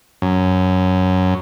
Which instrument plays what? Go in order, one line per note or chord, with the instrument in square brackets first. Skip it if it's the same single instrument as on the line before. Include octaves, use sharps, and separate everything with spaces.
[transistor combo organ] F#2